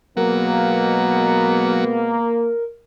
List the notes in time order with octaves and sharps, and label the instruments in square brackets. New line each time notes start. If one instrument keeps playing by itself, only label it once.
[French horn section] B2 G#3 B3 [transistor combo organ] F#3 [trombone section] A#3 [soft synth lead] A#4